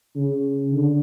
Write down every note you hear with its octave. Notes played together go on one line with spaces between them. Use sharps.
C#3
D3